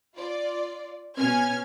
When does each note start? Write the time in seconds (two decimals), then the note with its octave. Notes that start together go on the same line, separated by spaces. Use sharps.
0.16 F4 D5
1.18 B2 C#4 G#5 F6 G#6